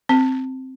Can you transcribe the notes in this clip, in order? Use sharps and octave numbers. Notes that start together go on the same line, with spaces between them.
C4